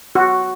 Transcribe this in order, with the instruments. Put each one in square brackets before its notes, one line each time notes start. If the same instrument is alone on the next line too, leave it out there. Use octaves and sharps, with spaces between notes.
[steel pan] F#4